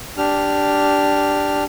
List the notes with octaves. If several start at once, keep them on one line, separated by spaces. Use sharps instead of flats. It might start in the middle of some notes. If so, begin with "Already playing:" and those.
D4 G4 F6